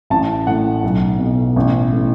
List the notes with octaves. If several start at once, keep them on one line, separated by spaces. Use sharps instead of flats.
A1 A5
A2 F#5
B1
B2
A1
A2